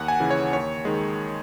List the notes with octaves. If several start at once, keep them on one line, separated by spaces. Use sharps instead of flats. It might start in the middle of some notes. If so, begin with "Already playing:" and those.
Already playing: D#2 F#5
G#5
C#3 E3
C#5
D#2 C#5
D#3 G#3